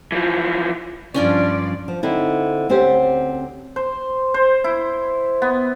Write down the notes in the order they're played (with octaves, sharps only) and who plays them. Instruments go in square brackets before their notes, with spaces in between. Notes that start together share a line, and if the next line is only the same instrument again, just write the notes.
[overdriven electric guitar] E3 F3
[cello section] G2 F3 D5 [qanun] C#4 D4 F4
[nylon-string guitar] F3
D3 C4 D#4 E4
D2 C4 C#4 G4 C5
[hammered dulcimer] C5
C5
E4
B3